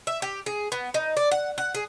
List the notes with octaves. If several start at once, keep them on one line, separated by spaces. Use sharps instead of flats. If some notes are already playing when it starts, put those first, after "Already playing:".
E5
G4
G#4
B3
D#4
D5
F#5
F#5
G#4